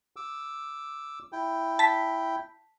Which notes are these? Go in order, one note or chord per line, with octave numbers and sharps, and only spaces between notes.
D6 E6
E4 G5
A5 B6